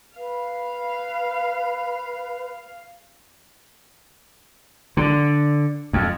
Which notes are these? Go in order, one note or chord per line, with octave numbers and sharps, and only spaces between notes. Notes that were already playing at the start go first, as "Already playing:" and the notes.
B4 F5
D3
F2